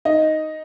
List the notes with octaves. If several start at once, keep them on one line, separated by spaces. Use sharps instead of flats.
D#4 D#5